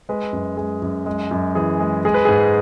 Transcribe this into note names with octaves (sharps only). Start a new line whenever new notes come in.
G#3 B4
F#2
G#3 G#4
F#2
G#3
F#2
E3 G#4
G#3
G#3 G#4
B4
G#2 G#4